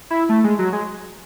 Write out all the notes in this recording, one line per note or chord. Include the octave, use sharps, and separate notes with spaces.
E4
A3
G#3
F#3
G#3